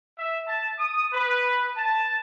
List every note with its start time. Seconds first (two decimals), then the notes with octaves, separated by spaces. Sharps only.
0.18 E5
0.47 A5
0.78 D#6
1.13 B4
1.77 A5